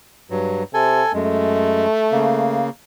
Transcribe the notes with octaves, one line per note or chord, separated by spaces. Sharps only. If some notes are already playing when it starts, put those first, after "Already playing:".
G2 F#3
C3 A4 G#5
F#2 G#3 A3
C#3 A#3